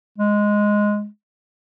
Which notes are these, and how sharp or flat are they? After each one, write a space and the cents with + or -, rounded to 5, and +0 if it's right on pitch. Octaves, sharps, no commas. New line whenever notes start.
G#3 +0